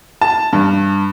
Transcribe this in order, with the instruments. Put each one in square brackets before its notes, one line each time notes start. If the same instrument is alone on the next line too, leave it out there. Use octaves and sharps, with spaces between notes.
[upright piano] A5
G2